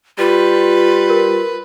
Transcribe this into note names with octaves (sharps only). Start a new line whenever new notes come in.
G3 F4 B4
A#4